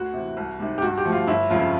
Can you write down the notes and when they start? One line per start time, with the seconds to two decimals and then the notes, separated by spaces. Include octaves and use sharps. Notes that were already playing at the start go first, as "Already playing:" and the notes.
Already playing: D2 F#4
0.14 C3 E3
0.37 C2
0.59 C3 D#3 G3
0.78 G4
0.82 G2 F#4
0.98 G4
1.05 D3 F3 A3
1.12 F4
1.27 G1 E4
1.50 F2 C#3 F4